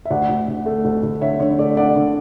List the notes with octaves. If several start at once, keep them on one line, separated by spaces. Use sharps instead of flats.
E5
D2 D5 F#5
D2
D2
A3
D2
D2
D3 C#5 E5
D3 C#5
A3 D5
D3 D5 F#5
D3